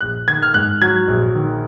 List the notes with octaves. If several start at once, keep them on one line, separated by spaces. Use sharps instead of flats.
A#1 F#6
D#3 G#6
F6
G#2 F#6
F#3 G#6
A#1
D#3